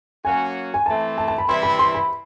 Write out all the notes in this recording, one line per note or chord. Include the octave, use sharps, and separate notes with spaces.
F#3 A#3 C#4 F#4 G#5
G#5
E3 A3 C4 A5
A5
A5
B5
C3 E3 G3 C4 E4 C6
B5
C6
B5